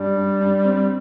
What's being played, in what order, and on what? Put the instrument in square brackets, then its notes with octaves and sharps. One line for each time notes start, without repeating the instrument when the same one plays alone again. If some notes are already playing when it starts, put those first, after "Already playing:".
Already playing: [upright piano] G2 [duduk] G3
[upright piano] G2
G2
C4